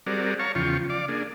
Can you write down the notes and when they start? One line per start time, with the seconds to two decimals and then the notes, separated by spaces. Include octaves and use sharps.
0.06 G3 C4 F#4 G#4 A#4 D5
0.39 C#5 F5 A5 A#5 C#6
0.55 E2 C#3 F3 F4 G5 C#6
0.90 D5 F5 D6
1.08 A#3 D4 G#4